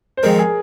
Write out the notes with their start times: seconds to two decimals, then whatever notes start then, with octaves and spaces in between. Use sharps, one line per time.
0.17 C5
0.23 F2 D#3 G#3 C4 A#4
0.39 G#4